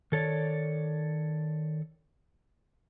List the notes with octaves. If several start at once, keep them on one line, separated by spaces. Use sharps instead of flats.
D#3 A4 C#5 D5